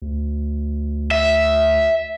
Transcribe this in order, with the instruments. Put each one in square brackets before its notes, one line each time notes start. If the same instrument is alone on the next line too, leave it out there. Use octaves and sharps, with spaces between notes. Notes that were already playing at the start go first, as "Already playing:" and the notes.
[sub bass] D2
[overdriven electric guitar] E5